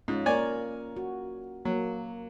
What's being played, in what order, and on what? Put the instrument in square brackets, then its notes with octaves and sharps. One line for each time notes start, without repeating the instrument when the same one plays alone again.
[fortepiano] G#2 [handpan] C#4 F4
[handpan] A#3 A#4 [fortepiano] C#5 D5 G#5
[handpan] F#4
[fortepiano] F#3 [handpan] A#3